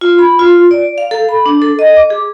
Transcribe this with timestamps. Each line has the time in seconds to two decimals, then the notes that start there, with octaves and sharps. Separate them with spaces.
0.01 F4
0.19 B5
0.39 F4
0.71 D5
0.98 F5
1.11 A4
1.29 B5
1.46 D4
1.62 A4
1.79 D#5
1.97 D6
2.10 G#4